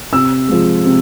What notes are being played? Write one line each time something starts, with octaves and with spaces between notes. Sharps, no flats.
C3 E6
F3 G#3
C3